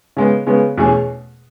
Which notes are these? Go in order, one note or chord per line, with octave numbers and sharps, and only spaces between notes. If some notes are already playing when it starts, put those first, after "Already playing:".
C#3 G#3 B3
C#3 G#3 B3
E2 B2 A3 C#4 G#4